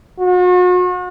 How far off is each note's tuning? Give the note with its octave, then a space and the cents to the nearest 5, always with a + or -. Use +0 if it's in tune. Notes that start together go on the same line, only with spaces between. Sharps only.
F#4 -40